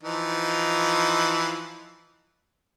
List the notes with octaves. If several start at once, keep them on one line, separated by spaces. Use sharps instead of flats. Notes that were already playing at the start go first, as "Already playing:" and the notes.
E3 F3 D#4